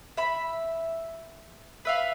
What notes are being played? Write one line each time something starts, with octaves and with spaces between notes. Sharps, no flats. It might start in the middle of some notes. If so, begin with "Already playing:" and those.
E5 B5
B4 E5 F5